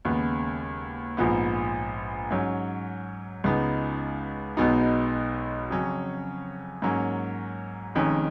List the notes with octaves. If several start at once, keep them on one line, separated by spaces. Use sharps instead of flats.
D#2 C#3 G#3 B3
A#1 G#2 F3 B3
G#2 F#3 C#4
C#2 C#3 G#3 B3 D#4
B1 B2 G#3 B3 D#4
F2 C#3 F#3 C#4
G#2 F#3 A#3 C#4
F1 F2 D#3 G#3 C#4